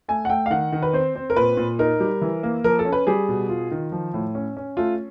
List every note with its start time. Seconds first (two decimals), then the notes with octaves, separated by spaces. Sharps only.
0.08 A3 G#5
0.25 F#5
0.29 A3 G5
0.46 F5
0.50 D#3 F#5
0.72 D#3
0.82 B4
0.93 C4 C5
1.15 C4
1.30 A#4
1.36 A#2 B4
1.57 A#2
1.79 D#4 A#4
2.00 G3
2.22 E3
2.43 A#3
2.64 F3 A#4
2.79 A4
2.85 C#4
2.92 B4
3.07 G3 G#4
3.28 B2
3.49 F4
3.71 D#3
3.92 F3
4.14 A2
4.35 C#4
4.57 C#4
4.77 A3 F4